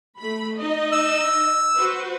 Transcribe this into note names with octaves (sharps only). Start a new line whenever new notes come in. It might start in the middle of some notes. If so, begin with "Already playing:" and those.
A3 B5
D#4 D#5
E6
F#4 B4 C5